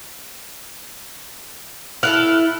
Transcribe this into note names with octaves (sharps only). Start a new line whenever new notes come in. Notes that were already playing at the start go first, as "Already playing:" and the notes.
E4 F4 A4 F6 F#6